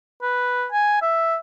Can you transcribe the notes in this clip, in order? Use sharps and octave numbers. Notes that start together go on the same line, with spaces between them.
B4
G#5
E5